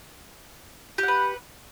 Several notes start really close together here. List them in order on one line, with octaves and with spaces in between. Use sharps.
G4 F#5 B4